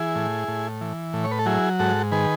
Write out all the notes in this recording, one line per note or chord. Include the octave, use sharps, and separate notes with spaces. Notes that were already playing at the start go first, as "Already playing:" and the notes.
Already playing: E3 E4 G#4
A2
A2
E3
A2
C#5
B4
A4
F#3 E4 G#4
G#2 F#4 A4
D#3 G#4 B4